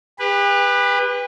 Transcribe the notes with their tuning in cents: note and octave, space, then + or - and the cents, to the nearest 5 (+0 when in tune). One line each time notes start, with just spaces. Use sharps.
G4 +40 B4 -5